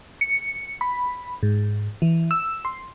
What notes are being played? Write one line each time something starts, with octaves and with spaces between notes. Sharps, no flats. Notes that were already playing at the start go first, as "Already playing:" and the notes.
C#7
B5
G#2
E3
E6
C6